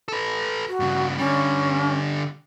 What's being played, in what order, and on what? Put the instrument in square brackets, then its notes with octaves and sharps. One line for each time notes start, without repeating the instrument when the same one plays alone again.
[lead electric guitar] A4 B4
[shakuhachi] F#4
[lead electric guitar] G2 C#3
[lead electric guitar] D3 G3 [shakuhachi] C#4